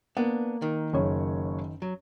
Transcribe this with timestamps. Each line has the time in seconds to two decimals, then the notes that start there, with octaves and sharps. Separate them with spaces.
0.17 A#3 B3 D4
0.62 D#3
0.93 F#1 C#5
1.82 F#3